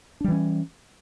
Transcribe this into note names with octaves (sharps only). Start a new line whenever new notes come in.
E3 G3 C#4 D4